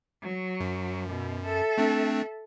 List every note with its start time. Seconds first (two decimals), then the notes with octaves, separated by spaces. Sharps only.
0.22 F#3
0.60 F#2
1.09 B2
1.45 A4 E5
1.78 A3 C4 D4